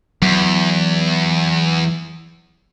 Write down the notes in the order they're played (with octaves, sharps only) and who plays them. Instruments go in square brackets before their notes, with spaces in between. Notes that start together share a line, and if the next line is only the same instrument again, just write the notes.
[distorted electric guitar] E2 [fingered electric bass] F#3